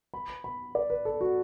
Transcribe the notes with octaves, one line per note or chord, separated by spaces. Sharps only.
B5
B5
D5
B4
A4
F#4